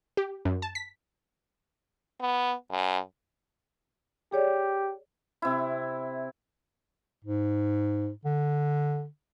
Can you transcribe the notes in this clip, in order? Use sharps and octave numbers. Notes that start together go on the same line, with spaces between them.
G4
F#2
A5
B6
B3
F#2
G4 G#4 C#5 D5
C3 E4
G#2
D3